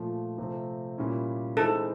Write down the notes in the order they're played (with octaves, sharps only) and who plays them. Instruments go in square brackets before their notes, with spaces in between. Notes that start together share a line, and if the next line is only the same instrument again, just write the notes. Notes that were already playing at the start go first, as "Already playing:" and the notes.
Already playing: [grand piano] A#2 F3 A3
C3 F3 A3 C4
A#2 G3 A#3 C#4 E4
[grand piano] E3 G#3 C4 D#4 [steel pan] A4